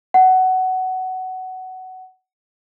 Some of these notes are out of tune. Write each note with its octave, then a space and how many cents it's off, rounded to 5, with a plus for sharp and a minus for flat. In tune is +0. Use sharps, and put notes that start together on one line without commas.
F#5 +15